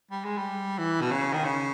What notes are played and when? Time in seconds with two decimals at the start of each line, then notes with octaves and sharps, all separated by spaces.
0.11 G3
0.25 G#3
0.38 G3
0.78 E3
1.01 B2
1.11 C#3
1.33 D#3
1.45 C#3